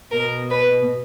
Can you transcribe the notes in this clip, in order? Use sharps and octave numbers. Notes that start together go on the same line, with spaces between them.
B2 A#4
B4